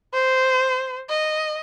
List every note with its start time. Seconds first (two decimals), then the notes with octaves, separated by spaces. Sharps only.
0.14 C5
1.10 D#5